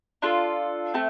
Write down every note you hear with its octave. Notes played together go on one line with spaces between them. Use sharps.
D4 F4 A4
A3 C4